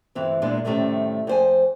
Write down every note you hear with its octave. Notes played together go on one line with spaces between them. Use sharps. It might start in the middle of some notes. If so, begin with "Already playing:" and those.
D2 G2 E3 C4
F#2 A#2 G#3 B3 D4
A2 C3 D#3 G3 A3 C#4
F2 C5 G#5